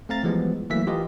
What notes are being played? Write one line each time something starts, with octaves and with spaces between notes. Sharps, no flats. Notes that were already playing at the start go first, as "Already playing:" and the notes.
A3 C4 F5 A#5 A6
E3 F3 G3 G#3 B3
E3 F#3 A3 A#3 E5 B6
E3 F4 G4 A#4 D#5